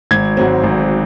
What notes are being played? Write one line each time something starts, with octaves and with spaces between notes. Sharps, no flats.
G#1 G#6
G#2 F#3 C4
G#1